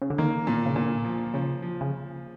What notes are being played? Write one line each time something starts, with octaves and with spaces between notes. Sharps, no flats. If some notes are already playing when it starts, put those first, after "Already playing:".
C#3
D3
D#3 A#3
A#2
C#3
A#2 D3
F3
C#3 F3
F3
C#3